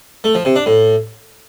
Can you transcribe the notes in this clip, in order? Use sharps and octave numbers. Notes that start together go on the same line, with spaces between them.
A3
F3
C3
D4
A2